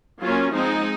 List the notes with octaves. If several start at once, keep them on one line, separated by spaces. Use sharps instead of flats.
F#3 A#3 C#4 F4
F3 G#3 C4 D#4